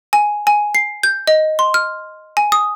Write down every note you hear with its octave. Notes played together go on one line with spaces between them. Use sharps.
G#5
G#5
C7
G6
D#5
C6
F6
G#5
D#6